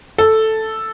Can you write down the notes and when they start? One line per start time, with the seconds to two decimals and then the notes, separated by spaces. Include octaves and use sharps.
0.18 A4